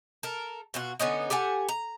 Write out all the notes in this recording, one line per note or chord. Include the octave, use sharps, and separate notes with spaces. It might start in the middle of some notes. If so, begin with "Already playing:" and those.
A4 A#4
B2 F4 F#4
D3 B3 C#4 D#4
G4 A4 F#5 G#5
A#5